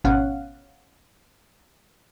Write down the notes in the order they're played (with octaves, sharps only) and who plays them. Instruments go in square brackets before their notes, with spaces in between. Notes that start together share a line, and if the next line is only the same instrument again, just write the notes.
[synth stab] G#1 B2 C#4 F5 F#5